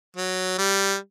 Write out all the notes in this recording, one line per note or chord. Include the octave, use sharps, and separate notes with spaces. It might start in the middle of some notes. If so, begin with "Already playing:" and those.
F#3
G3